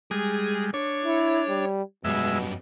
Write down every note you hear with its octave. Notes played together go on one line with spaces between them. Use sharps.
G3 G#3 G#4
D4 C#5
E4
G3
F#2 B2 G3 G#3 E5